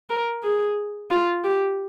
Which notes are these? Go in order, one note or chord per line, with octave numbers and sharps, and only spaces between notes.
A#4
G#4
F4
G4